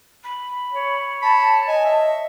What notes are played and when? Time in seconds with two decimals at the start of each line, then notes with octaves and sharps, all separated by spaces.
0.23 B5
0.73 C#5
1.22 A5 B5
1.68 D#5 G#5
1.85 E5